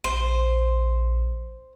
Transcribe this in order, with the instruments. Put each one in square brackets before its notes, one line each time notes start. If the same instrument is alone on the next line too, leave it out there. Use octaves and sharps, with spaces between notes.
[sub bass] A#1 [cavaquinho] C5